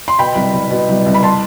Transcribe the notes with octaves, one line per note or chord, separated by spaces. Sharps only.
C6
B2 G5 B5
C2
C2
B2
C2
C2
B5
A5 C6